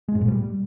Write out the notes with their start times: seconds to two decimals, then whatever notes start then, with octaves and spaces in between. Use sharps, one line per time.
0.08 G#3
0.15 G#2
0.21 A#2
0.28 G3